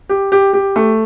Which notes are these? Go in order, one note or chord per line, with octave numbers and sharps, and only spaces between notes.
G4
G4
G4
A3